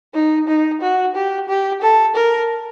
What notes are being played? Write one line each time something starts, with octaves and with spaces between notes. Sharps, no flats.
D#4
D#4
F#4
G4
G4
A4
A#4